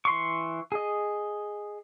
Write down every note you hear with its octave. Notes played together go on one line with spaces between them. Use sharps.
E3 C6 C#6
G#4 D#5